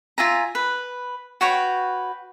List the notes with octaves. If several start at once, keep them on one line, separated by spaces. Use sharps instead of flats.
F4 E5 G#5 A#5
B4
F#4 B4 C#5 G5